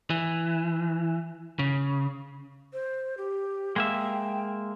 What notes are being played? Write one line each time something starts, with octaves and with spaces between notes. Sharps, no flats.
E3
C#3
C5
G4
G#3 A#3 E5 G5